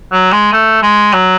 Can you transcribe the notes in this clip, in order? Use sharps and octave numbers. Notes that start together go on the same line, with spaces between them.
F#3
G#3
A3
G#3
F#3